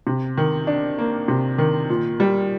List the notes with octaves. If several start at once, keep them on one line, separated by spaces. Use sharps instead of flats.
C3
D#3
D4
A#3
C3
D#3
A#2
G3